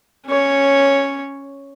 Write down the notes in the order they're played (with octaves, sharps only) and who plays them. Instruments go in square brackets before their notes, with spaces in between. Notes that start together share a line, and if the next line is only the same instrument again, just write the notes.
[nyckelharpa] C#4 C#5